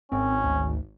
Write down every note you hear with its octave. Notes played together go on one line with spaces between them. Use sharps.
G#1 C4 C#4
D2